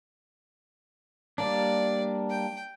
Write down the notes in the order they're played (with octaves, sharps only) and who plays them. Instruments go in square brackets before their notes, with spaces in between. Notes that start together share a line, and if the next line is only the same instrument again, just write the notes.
[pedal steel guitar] G3 A#3 D4 [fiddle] D5
[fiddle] G5